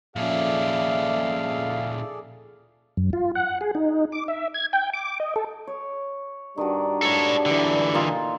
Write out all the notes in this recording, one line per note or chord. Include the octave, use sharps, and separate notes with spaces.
A#2 F3 C#4 G#4 A4 D5 E5 F5
F#2
F4
F#5
G#4
D#4
D6
E5
G#6
G5
D6
D#5
A4
C#5
G2 D#3 G3 D4 F#4
A4 C#5
D3 E3
A#2 D#4 F4